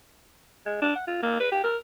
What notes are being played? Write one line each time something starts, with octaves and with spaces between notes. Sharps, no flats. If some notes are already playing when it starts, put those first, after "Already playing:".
G#3
D4
F#5
F4
A#3
B4
G4
A#4